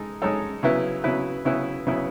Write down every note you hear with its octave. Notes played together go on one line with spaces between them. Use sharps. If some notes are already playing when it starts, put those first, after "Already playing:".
Already playing: G#3 D#4 A4
G#3 D#4 A4 C#5
C#3 F#3 B3 E4 B4
C#3 F#3 B3 E4 B4
C#3 F#3 B3 E4 B4
C#3 F#3 B3 E4 B4